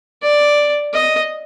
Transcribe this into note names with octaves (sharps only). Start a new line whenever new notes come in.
D5
D#5